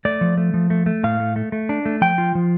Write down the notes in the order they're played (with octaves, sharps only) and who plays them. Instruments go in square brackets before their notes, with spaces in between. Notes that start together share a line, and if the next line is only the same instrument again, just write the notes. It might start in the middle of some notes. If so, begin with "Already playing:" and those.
[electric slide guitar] A3 D5
F3
A3
F3
A3
A3
A2 F5
A3
A3
A3
D4
A3
F3 G5
F4
F3